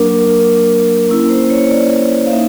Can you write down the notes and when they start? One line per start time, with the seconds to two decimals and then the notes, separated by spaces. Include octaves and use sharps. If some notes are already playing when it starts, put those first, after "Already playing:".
Already playing: F#3 A#3 D4 A#4
1.09 A#3 C#4 E4
1.30 C5
1.50 C#5
1.70 D5
2.26 F5
2.32 A#3 D#4 E5